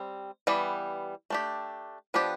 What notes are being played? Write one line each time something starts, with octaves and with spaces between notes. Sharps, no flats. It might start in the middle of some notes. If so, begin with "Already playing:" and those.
Already playing: G3 C4
E3 G3 B3
A3 D4 G4
F3 B3 D4 G4